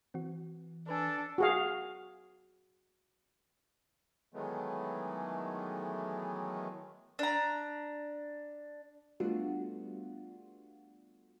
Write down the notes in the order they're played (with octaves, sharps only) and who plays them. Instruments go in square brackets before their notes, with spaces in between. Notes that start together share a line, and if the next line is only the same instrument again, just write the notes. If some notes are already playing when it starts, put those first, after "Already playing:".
[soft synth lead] E3 [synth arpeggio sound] C4 F#4
[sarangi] D4 [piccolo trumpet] A4 [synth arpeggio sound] B4 G#5
[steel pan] F#4 G#4 F5
[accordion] D#3 E3 F#3 G#3 A3 B3
[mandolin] D4 A#5
[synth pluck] G3 A3 B3 D4 F4 F#4